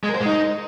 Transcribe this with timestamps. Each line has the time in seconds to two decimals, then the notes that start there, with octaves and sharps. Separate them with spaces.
0.04 G#3
0.09 A#4
0.15 C5
0.20 G#3
0.26 D#4